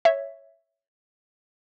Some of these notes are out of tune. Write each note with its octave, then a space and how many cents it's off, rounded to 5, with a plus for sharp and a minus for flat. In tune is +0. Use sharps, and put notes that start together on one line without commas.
C#5 +0 E5 +0